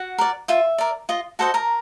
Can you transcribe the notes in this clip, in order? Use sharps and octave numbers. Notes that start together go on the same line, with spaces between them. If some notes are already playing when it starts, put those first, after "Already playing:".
Already playing: F#4 F#5
A#4 D5
F4 E5
A#4 D5
F4 D#5
F#4 A4 C5 D#5 F#5
A#4 A#5